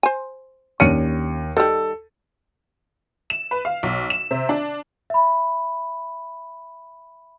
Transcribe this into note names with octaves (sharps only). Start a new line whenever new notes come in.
C5 G#5
D#2 C#4 D4 C#7 D#7
D#3 G3 A4
E7
B4
F5
B1
E7
C3
D4
E5 B5